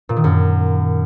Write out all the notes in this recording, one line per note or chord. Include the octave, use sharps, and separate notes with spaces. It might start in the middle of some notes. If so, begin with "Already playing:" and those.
A#2
D#3
F#2